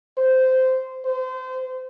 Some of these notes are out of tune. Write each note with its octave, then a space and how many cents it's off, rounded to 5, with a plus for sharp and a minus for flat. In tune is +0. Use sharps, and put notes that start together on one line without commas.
C5 -15
C5 -30